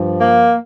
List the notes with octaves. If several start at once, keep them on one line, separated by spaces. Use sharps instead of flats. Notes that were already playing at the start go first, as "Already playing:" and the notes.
Already playing: G2 F3
A#3